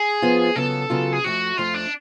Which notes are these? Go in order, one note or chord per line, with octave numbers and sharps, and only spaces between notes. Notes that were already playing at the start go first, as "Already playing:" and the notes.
Already playing: G#4
F2 F3 B3 F4
C#3 F#3 B3 F4 A4
C#3 F#3 B3 F4
G#4
F2 F3 A3 F#4
F2 F3 A3 F4
D4